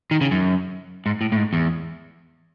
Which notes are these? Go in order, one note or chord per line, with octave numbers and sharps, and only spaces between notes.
D#3
C#3
F#2
G#2
A2
A2
G#2
E2